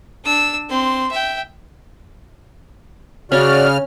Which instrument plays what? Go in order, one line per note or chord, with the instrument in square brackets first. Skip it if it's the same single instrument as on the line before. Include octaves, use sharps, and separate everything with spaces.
[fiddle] D4 E6
C4 C6
E5 G5
[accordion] C#3 F6 [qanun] C#4 [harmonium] F#4 D5